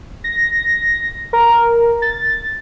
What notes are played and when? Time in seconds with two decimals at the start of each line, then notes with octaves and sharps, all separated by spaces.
0.24 A#6
1.33 A#4
2.02 A6